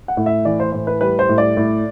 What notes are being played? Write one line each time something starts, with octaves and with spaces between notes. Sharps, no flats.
F#5
A2
E5
E3 D5
C5
A2 C5
B4
G3 B4
C5
A2
D5
A2